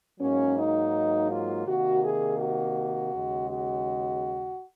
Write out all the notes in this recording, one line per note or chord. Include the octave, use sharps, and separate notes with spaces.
G#2 F#3 A#3 C#4
D#4
F4
C3 D#3 A#3 F#4
G#4
F#4
D#2 C#3 G#3
F#4